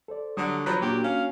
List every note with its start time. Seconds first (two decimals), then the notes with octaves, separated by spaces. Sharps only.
0.08 A4 C5 D5
0.37 D3 F#3 G3 D#6
0.66 F3 F#3 B4
0.82 A#2 A#3 D4 F#4 G4
1.04 C#4 F5